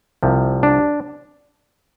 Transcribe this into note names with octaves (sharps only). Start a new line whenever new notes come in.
C2 C3 F3
D4